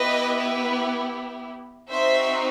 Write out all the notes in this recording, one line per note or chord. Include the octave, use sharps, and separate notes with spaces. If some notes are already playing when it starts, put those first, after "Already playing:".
Already playing: B3 E4 G4 B4 D#5
B4
C4 D#4 F#4 C5 E5